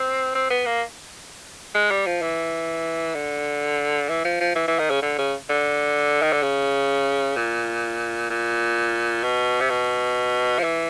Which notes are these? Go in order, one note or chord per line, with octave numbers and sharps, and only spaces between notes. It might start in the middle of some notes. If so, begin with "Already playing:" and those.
Already playing: C4
C4
B3
A#3
G#3
G3
F3
E3
D3
E3
F3
F3
E3
E3
D#3
C#3
D3
C#3
D3
D#3
D3
C#3
A#2
A#2
B2
C3
B2
F3
E3